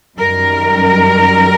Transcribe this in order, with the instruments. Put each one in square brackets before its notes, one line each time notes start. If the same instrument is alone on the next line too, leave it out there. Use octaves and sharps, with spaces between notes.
[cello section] F#2 D#3 G3 A#4